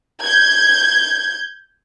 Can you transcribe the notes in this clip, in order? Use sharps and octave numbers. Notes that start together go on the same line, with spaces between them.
G6 G#6